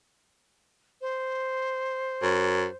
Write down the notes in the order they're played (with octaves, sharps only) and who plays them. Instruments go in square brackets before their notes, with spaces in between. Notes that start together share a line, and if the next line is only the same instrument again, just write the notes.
[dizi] C5
[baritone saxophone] F#2